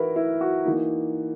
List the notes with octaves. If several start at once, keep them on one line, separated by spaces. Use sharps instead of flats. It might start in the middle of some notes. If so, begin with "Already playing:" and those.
Already playing: E3 D#4 E4 F#4 A#4 B4
E4
F#4
E3 A#3 D#4